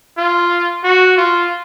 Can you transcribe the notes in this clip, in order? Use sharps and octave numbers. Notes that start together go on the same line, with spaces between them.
F4
F#4
F4